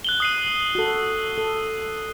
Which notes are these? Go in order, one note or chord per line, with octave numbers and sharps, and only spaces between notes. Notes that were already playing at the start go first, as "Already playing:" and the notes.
F#6 F#7 G7
D#6 C7 D#7
F#4 A4
A4